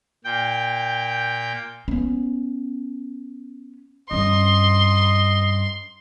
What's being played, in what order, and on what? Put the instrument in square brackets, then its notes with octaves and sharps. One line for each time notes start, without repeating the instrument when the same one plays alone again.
[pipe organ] A#2 G5 G6
[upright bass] B3 C#4
[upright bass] G2 C#4 [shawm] D#5 [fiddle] C6